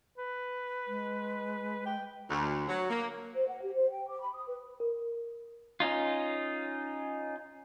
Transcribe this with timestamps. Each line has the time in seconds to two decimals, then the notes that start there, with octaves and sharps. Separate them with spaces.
0.18 B4
0.87 G#3
1.86 G5
2.30 D2
2.68 F#3
2.90 A#3
3.34 C5
3.48 F#5
3.61 G4
3.74 C5
3.91 G5
4.08 D6
4.20 B5
4.33 D#6
4.45 B4
4.80 A#4
5.80 C#4 D#4 F4